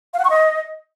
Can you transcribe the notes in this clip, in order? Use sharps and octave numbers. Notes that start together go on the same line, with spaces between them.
F5
F#5
C#6
D#5